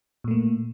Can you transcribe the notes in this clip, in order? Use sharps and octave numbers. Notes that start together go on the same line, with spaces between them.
A#2 A3 A#3